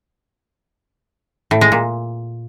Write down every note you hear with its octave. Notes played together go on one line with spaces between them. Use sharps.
A2
G#3
A#2